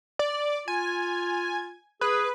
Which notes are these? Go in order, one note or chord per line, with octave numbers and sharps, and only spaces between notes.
D5
F4 G#5
G#4 B4